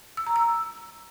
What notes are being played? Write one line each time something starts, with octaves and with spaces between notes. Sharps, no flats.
E6
A#5
E6